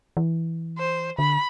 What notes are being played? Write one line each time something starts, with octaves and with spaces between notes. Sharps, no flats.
E3
C5
D3 B5